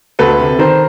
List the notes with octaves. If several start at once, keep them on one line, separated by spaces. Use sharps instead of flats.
D2 A4 B4
C3
D#3 A#4 C5